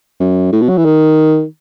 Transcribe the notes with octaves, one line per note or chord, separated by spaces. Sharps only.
F#2
A2
B2
F#3
E3
D#3